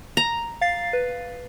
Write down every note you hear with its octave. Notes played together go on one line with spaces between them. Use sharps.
A#5
F5 A6 C7
B4